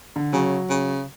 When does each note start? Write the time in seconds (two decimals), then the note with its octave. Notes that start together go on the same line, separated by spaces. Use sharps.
0.16 D3
0.33 C#3 F#3
0.70 C#3